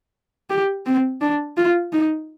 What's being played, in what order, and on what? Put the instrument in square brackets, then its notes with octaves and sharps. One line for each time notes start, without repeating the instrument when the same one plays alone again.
[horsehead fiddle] G4
C4
D4
F4
D#4